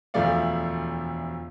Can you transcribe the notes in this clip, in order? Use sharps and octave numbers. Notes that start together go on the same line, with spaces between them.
E1 D2 F3 A3 D5 F5